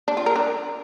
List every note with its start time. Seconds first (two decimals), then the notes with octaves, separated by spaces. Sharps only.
0.08 D4
0.17 F4
0.26 A#4
0.36 D4